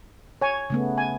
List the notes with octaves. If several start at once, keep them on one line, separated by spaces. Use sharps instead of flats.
C#5 G#5
C#3 A3 B3
G#5